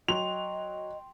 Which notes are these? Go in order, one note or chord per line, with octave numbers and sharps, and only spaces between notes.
F#3 D#5 G5 C6 F7